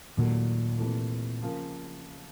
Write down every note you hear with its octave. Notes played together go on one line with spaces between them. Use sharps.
D#2 A#2 D#3 F#3 A3
C3 E3 A3
C#3 F3 A#3